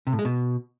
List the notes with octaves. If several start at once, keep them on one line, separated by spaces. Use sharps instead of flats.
C3
A2
G#3
B2